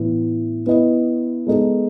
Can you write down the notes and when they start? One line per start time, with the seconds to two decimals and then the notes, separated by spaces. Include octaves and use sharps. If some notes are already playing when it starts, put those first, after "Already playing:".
Already playing: A2 E3 B3 E4
0.66 B3 E4 B4 D#5
1.47 G#3 B3 D#4 A4